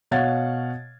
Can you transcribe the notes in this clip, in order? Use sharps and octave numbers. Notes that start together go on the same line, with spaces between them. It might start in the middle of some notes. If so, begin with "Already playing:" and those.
B2 C#5 F5 F#5 G#6 A6